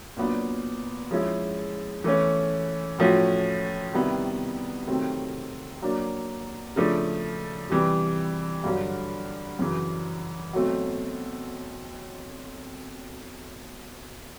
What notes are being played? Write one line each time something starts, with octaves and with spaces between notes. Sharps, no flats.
A#2 F#3 B3 D4
F3 G#3 C#4 E4
E3 A3 C#4
A2 F3 A3 C#4 F#4
C3 D#3 G3 B3 E4
C3 D#3 F#3 A3 C4
F#3 A#3 D4
C#3 F3 A3 D4
C3 E3 G3
G2 D3 F#3
F#2 C#3 E3
B2 F#3 A3 C4